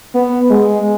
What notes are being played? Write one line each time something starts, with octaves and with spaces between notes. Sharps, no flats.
B3
G#3